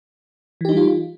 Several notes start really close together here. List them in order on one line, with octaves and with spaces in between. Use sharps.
E3 G4 D#4 G3 F4